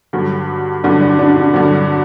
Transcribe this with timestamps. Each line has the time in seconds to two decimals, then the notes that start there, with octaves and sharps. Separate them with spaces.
0.13 G2 D3 F#3
0.84 G2 D3 F#3 D4
1.01 D4
1.19 D4
1.36 D4
1.54 G2 D3 F#3